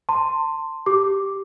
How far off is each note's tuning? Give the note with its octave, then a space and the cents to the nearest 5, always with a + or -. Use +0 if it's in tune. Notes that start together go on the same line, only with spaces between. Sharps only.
A5 +30 C6 +0
G4 +0 D6 +0